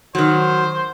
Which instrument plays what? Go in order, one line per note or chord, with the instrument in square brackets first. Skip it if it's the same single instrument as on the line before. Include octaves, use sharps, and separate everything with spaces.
[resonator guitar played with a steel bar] D#3 F#3 [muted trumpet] C5